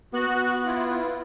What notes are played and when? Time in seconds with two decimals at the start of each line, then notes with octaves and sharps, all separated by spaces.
0.14 B3 F#4 F#6
0.65 E4 F4